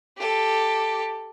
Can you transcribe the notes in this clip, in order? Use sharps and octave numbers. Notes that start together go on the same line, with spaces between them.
G4 A4